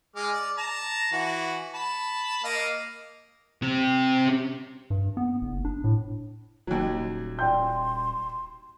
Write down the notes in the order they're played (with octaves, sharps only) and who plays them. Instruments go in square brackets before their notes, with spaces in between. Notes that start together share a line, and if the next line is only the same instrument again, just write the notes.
[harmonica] G#3 D6 F6
D5
A5 A#5
E3 F#4
A5 B5
A#3 D#5 F5
[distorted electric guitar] C4 G4
[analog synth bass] G2
B3
F#1
D4
A2
[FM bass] D#1 [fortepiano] D#2 F#3
[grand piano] D5 G5 G6 [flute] C6